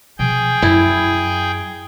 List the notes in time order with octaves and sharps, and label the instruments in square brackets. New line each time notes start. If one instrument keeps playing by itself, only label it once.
[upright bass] B2 F3 [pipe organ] G#4 G5
[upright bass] F#2 [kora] E4